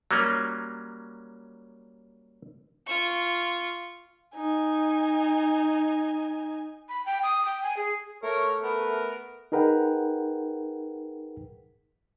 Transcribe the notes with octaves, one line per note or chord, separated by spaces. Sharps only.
F#3 G3 A#3 C#4
F4 C#6
D#4 G#5
B5
G5
D#6
G5
G#5
G#4
A3 A#4 C#5
B3 A#4
D#4 G#4 A#4 B4 F#5 G5